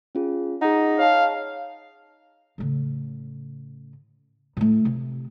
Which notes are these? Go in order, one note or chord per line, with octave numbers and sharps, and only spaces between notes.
C#4 F4 G#4
D#4 G#4 F#5
C#5 F5 A5
A2 C#3
A2 A3
C3